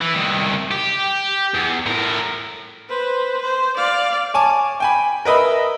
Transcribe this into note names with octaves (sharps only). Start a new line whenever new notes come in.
E3
C2 D#3
G4
E2
A2 A#4
B4 C5
C5
D5 F5
C#5 G#5 A5 D6
G5 G#5 B5
A#4 B4 D#5 E5 B5